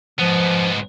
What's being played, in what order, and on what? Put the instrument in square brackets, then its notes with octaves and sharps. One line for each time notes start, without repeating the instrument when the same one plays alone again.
[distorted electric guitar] G#2 B3 [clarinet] F3